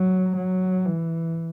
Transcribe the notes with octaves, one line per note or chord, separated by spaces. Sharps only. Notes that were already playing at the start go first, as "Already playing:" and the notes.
Already playing: F#3
F#3
E3